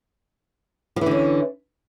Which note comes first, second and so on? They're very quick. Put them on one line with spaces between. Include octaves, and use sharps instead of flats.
F3 E3 D3 C#4